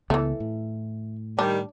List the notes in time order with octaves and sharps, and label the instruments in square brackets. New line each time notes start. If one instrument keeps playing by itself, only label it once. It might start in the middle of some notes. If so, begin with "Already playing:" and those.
[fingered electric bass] C#2 C#3 B3 [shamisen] E3 A3
[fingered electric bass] A2
[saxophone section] D#3 G3 [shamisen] D4